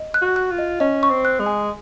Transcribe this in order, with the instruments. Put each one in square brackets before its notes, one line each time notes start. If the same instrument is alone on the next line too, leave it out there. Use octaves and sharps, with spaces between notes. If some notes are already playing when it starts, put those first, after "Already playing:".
Already playing: [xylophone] D#5
F#6
[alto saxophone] F#4
[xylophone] F#6
[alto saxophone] F4
[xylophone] D#5
[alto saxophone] C#4 [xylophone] D#5
[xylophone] C#6
[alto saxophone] C4
[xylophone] F#6
[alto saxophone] G#3
[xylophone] G#5